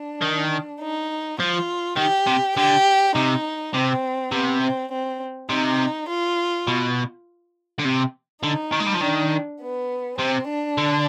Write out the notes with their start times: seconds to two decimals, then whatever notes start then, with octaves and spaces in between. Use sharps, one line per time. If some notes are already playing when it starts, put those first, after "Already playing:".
Already playing: D4
0.22 D#3
0.80 D#4
1.40 F3 F4
1.97 D#3 G4
2.27 C3
2.57 D3 G4
3.15 C3 D#4
3.74 C3 C4
4.32 C3 B3
4.62 C4
4.91 C4
5.50 C3 D#4
6.08 F4
6.67 B2
7.79 D3
7.85 C3
8.43 D3 D#4
8.72 D#3
8.80 G#3
8.87 G3
8.95 F3
9.01 D#3 D4
9.60 B3
10.18 C3 C4
10.49 D4
10.78 D3